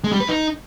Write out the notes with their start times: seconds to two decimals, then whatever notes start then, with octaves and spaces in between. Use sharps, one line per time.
0.04 G#3
0.12 G3
0.20 B4
0.28 D#4